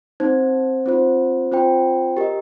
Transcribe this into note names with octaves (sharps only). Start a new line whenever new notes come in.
C4 D#4 C5
C4 F4 C5
C4 F4 C5 G5
G4 A#4 D#5